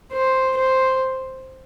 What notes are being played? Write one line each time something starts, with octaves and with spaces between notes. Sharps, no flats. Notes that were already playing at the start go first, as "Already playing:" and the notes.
C5
C5